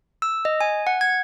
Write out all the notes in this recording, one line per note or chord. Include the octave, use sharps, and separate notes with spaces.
E6
D#5
G#5
F#5
G#6